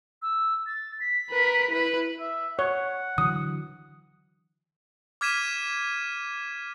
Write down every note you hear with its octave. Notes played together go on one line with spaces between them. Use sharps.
E6
A6
B6
A#4 B4
E4 B4
E5
C#5 F#5
D3 E3 F#3 D#6
D6 F6 G#6 B6 D#7 E7